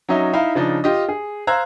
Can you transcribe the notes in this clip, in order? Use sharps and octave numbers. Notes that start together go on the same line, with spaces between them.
F#3 C#4 D#4 E5
D#4 E4 E5 F5
C#3 F3 D4 D#4
F4 G4 D#5
G#4
C5 F5 A#5 E6 F#6 G#6